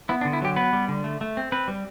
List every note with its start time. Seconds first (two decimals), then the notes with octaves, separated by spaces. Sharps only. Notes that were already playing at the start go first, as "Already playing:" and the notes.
0.09 B3 E4
0.21 D4
0.25 D3
0.33 E4
0.42 F#3 G4
0.56 B3 B4
0.73 G3
0.88 D3
1.04 A3
1.21 A3
1.37 C4
1.52 C4 B4
1.68 G3